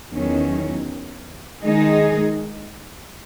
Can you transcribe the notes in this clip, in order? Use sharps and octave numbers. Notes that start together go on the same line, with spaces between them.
E2 D#3 F#3 C#4
D#3 G#3 D#4 G#4